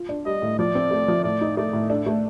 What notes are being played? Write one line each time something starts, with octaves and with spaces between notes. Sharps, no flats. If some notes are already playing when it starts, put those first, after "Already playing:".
Already playing: F4
D4
G3 D#5
A2
F3 D5
C4
A3
F3
A2 D5
D#4
A3 D5
A2
D4 A4
A3